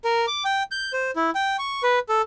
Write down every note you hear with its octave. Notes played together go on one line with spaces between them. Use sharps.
A#4
D6
G5
G6
C5
E4
G5
C#6
B4
A4